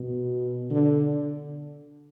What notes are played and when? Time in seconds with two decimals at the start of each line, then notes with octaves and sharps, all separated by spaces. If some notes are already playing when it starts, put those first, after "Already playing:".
Already playing: B2
0.70 D3